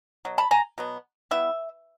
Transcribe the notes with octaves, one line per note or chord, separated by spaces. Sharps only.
B2 F#3
A5 B5
G#5 A#5
B2 F#3 B3
G3 B3 E4 E5